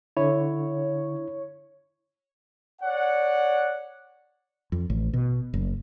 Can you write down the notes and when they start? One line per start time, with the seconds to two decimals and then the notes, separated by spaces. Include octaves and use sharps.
0.17 D3 E4 C#5
2.82 C#5 D5 F#5
4.72 F2
4.90 A1
5.13 B2
5.54 F#1